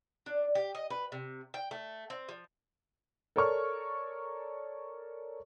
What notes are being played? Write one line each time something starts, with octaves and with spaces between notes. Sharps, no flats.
D4
G4
D#5
B4
C3
G5
A3
C4
F3
A4 A#4 C#5 D5 C#6 F6